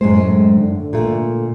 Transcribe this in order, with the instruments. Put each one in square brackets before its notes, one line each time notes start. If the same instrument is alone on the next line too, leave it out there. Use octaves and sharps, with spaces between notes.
[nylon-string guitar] F#2 A2 C5 [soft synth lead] G#3
[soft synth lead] D3
[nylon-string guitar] A#2 A3